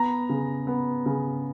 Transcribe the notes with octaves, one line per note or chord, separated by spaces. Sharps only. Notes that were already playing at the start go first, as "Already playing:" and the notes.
Already playing: B3 A#5
C#3
B3
C#3